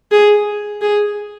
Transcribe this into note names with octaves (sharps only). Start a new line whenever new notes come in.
G#4
G#4